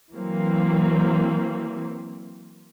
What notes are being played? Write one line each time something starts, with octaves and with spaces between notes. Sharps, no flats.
E3 F#3 A#3 C4